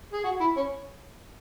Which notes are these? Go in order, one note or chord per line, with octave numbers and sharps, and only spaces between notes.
G#4
F#4
E4
C#4